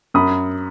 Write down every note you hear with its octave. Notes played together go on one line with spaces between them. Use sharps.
F#2 B5 D#6